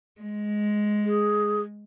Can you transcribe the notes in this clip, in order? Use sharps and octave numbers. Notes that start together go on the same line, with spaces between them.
G#3
G#4